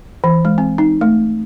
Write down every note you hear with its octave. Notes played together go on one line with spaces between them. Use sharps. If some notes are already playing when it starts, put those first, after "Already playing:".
E3
G#3
C4
D#4
A3